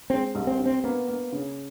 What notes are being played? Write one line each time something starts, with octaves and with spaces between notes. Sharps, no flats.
G#3 C4
C2
C4
C3
C4
A#3 B3
A#3
C#3